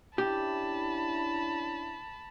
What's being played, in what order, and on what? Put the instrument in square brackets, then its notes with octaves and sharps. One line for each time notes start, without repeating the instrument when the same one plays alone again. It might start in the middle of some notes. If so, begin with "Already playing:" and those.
[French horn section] C#4 D4 E4 [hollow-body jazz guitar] G4 [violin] A5 B5